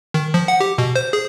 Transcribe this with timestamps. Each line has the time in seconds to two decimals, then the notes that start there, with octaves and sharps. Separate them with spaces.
0.14 D#3
0.34 F3
0.48 F#5
0.60 G4
0.78 B2
0.96 C5
1.13 G#4